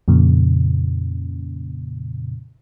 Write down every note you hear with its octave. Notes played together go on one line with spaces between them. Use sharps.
F2 A#2 C#3